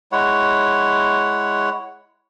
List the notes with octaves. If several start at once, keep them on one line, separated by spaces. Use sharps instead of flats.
G#3 E4 C#5 F#5